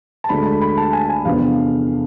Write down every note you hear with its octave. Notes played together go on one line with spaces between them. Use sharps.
A5
D2 D3 G#3 B5
B5
B5
A5
G#5
G#5
E2 C3 F3 B3 D4 F5